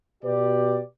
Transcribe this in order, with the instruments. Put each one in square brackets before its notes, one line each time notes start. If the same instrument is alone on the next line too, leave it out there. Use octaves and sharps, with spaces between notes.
[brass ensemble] B2 G4 B4 D5